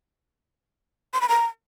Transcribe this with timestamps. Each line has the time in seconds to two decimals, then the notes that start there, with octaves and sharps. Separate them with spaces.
1.14 C6
1.21 B5
1.29 A#5